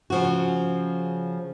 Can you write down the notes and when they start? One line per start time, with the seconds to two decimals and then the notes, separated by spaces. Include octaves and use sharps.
0.10 C#3 F3 F#4